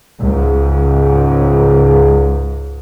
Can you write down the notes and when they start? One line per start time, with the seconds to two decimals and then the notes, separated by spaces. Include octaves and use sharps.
0.20 C#2 G#2